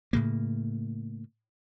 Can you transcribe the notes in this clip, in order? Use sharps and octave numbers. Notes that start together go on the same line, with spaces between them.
A2 C#3 A#3